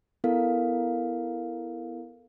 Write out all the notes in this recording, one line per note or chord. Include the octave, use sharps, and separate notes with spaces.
B3 E4 A4 A#4 F5